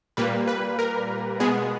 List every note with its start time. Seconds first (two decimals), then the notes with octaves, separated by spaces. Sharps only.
0.17 A#2 G3 A#3 B4
0.48 B4
0.79 A#4
1.40 B2 G#3 B3 G#4